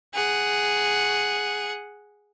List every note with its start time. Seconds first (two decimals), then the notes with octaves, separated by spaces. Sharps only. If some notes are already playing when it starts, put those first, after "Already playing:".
0.13 G#4 F#5